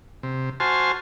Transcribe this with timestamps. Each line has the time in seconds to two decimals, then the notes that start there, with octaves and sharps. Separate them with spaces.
0.23 C3
0.60 F#4 C5 G#5 A5 C6 F6